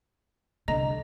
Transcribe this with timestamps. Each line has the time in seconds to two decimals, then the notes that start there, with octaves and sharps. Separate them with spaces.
0.68 C2 D3 D#5 A#5